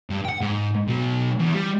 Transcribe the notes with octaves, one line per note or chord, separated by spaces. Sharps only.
G2
F#5 G5
G#2
B2 F#3
E2
G3